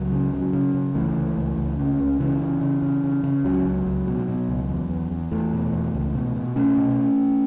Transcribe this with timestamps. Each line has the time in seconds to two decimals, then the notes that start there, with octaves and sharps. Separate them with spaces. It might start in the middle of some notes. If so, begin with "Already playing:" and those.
Already playing: C#2 F#3
0.12 C#3
0.33 C#3 F#3
0.53 C#3
0.74 C#3
0.95 C#2 E3 A3
1.17 C#2
1.37 C#2
1.58 C#2
1.79 C#3
1.99 C#2
2.20 C#3 E3
2.42 C#3
2.61 C#3
2.82 C#3
3.04 C#3
3.24 C#3
3.44 C#2 F#3
3.66 C#2
3.86 C#2
4.07 B2
4.28 B2
4.49 C#2
4.69 E2
4.90 E2
5.11 E2
5.31 E2 E3 A3
5.53 B2
5.73 E2
5.94 C#2
6.15 B2
6.36 B2
6.56 B2 A3 C#4
6.77 B2